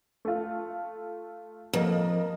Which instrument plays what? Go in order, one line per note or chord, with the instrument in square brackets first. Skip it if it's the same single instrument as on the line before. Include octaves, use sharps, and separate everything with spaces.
[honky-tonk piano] A3 F4
[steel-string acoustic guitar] F2 [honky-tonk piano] A#3 A#4 D#5